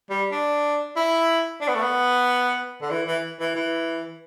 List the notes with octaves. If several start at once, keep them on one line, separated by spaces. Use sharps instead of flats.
G3
D4
E4
D4
B3
A3
B3
D3
E3
E3
E3
E3